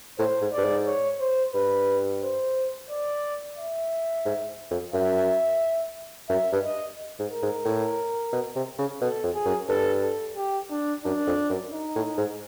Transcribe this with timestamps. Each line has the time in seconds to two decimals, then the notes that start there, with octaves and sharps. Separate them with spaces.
0.19 A2 C5
0.41 G#2
0.53 G2 D5
0.64 G#2
0.86 C#5
1.20 C5
1.54 G2 B4
2.22 C5
2.90 D5
3.58 E5
4.26 G#2
4.71 F2
4.93 F#2 E5
6.29 F#2 E5
6.52 G2
6.63 D#5
7.19 G#2
7.31 A#4
7.42 G#2
7.65 A2
8.33 B2
8.56 C3
8.78 C#3
9.01 B2 A4
9.23 F2
9.34 G#4
9.46 F#2
9.69 G2 A4
10.03 A4
10.36 G4
10.70 D4
11.04 F#2 D4
11.27 F2
11.50 F#2
11.73 D#4
11.95 A2
12.17 G#2